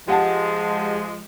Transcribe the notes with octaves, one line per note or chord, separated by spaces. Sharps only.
F3 G#3 G4 F#5 A5